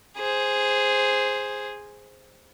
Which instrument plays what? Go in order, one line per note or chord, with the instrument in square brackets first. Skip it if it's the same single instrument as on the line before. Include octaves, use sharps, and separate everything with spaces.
[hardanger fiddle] G#4 C5